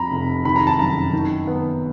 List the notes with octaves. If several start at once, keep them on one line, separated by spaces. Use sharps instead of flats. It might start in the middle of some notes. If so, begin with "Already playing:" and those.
Already playing: F2 A#5 B5
F1
D#3 B5
A#5
A5
F#2 A#5
D#3
B3